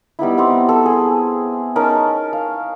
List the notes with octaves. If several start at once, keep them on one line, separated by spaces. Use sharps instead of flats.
G3 B3 D#4 E4
B3 C4 D6
A4
G#4
C#4 D#4 A#4 A5
F5